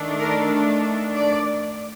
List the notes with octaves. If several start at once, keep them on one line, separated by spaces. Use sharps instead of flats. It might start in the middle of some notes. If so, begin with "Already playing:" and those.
Already playing: D#3 A3 D4
A#4
D5